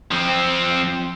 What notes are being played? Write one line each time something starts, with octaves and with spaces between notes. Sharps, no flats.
F3 C4